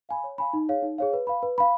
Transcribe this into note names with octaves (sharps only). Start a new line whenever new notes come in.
F5 G#5 B5
C#5
F5 G#5 B5
D#4
G#4 C#5 F5
D#4
G#4 C#5 F5
B4
F5 B5
B4
F5 B5